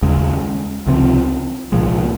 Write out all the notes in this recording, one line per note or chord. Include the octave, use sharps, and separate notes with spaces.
D#2 C#3 G#3
C#2 C3 F3 C4
C2 A#2 F3 G#3